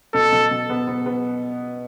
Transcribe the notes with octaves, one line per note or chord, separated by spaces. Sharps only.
B2 A4
B2
B2
B3
B3
B3